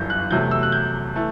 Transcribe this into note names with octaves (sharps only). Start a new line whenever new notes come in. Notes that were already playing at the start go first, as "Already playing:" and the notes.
Already playing: G1 F#2 E3 G3 G6
F#6
E2 C3 F#3 A3 G6
E6
F#6
G6
E3 A3